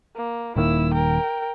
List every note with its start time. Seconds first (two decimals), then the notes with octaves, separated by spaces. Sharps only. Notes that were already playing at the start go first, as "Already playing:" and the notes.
0.16 A#3
0.56 D#1 D#3 A#3 E4 E6
0.94 A#4 G5